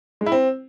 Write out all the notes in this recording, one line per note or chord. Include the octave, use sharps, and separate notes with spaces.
G#3
E4
C4